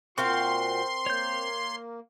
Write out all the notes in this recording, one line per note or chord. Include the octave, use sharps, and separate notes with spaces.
A#2 C4 F#4 A#4 C5 F5 C6 C#6
A#3 C#5 G6